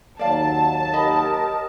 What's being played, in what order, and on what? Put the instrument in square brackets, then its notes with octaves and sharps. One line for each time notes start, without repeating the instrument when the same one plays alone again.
[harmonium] D#2 F#3 [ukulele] D5 F5 [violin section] A5
[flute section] G4 A#4 D#6 [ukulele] D#5 B5